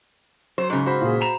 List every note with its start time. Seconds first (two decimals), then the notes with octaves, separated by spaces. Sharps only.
0.58 F#3 C5
0.70 G#2 C#3
0.86 F#4 C5 B5
1.02 A#2 G#4
1.21 A#5 E7 F7